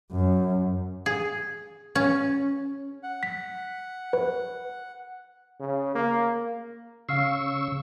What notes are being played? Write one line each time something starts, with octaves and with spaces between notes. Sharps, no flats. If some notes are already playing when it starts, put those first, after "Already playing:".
F#2
G#4
C#4
F#5
B6
B4
C#3
A#3
C#3 F5 C#6 E6 F6 C7